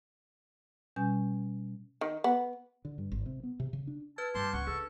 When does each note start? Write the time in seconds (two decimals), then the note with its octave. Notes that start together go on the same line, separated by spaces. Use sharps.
0.96 B2 G3 C#4 G#5 G6
2.01 D#3
2.24 B3
2.85 D3
2.98 G2
3.12 G#1
3.26 C3
3.43 B3
3.60 C3
3.73 C#3
3.87 D4
4.18 B4 A5 F6 G#6
4.35 G2 G4 A5 C6
4.53 C#2 F#5 C#6
4.67 D4 G#4 A4